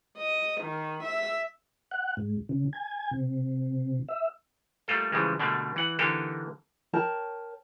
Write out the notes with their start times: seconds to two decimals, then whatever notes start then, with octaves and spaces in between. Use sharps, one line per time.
0.18 D#5
0.61 D#3
1.03 E5
1.91 F#5
2.17 G#2
2.49 C#3
2.73 G#5
3.11 C3
4.08 E5
4.88 G3 A3 A#3 F4 A4
5.12 C#3 E3 F3 G3 G#3
5.39 B2 D3 G3 A3 A#3
5.76 E3 F#5
5.99 D3 E3 A#3 D#4 G4 A4
6.93 A#4 C#5 G5 A5